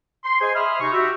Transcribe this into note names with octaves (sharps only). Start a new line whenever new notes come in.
C6
G#4 C5 D#5 G#5
E5 B5 C6 D#6 F6
C3 D#4 C#6
F#4 G4 E5